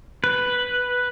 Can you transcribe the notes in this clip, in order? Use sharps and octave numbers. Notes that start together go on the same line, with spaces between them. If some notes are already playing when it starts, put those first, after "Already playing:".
B4